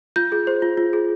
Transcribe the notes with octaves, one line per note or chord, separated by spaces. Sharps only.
F4 G6
G#4
C5
F4
F4
G#4